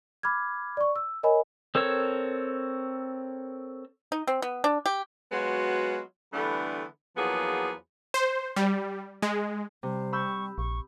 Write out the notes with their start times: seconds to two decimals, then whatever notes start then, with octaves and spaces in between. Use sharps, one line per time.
0.23 B5 D6 F6 G#6
0.77 D5 C#6
0.96 E6
1.23 A#4 C#5 D#5 G#5 B5
1.75 C4 A4 A#4 C#5 E6
4.12 D#4
4.27 C4
4.42 B3
4.64 D4
4.86 G4
5.32 F#3 G#3 B3 F4 F#4
6.33 D3 E3 G3 A3 B3 D4
7.17 E2 F3 F#3 A#3 B3 G#4
8.14 C5
8.56 G3
9.22 G#3
9.83 C3 G3
10.13 B5 C#6 E6 G6
10.58 A#1 C#6